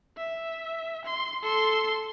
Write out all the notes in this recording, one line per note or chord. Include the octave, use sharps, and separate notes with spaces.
E5
C6
A4 C6